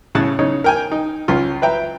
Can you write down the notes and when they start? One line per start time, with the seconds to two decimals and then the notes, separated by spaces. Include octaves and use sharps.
0.15 A2 C#3 C#5 A5 F#6
0.39 C#3 D#4 C#5
0.64 A#4 G5 G#5
0.92 D#4
1.28 C#2 C#4 F4
1.62 B4 E5 G5 A#5